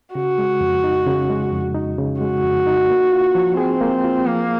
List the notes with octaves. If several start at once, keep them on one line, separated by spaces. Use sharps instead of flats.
C#3 F#4
G#3
F2
D#4
C#3
G#3
F2
D#4
C#3
G#3 F#4
F2
D#4
A#3
F4
F3
C4 G#4
A#3
F4
F3 A#3